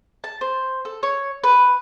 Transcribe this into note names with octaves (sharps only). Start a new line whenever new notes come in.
A5
C5
A4
C#5
B4